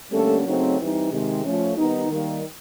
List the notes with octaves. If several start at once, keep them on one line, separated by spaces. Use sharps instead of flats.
D3 G3 A3 A#3 C#4 A4
C#3 F#3 A3 C4 D#4
E3 G3 C4 D#4
C3 D#3 G#3
F3 A3 C#4
D#3 G3 B3 D#4
D#3 G3 A#3